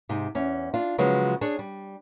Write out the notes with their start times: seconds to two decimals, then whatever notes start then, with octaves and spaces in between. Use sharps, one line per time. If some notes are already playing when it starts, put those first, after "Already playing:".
0.09 G#2 C3
0.35 E2 C#4
0.74 D4 F4
0.98 C#3 F3 F#3 G#3 B4
1.41 D4 G#4 C#5
1.59 G3